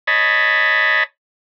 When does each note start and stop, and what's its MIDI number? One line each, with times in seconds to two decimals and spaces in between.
0.07 1.03 73
0.07 1.03 75
0.07 1.03 81
0.07 1.03 83